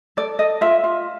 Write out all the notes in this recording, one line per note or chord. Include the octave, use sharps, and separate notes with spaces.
A4 D5
A4 D#5
F4 E5
F4